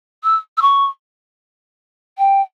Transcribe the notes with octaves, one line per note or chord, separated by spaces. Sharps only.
E6
E6
C#6
G5